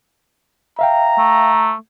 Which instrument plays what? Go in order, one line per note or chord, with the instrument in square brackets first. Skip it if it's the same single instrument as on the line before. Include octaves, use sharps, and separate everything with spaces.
[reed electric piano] E5 F5 G5 [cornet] A#5
[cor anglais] A3